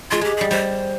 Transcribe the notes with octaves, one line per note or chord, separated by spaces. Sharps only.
G#3 F4
G#3 G4
G3 G#4
G3 C5